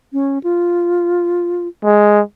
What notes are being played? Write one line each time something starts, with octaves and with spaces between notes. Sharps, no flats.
C#4
F4
G#3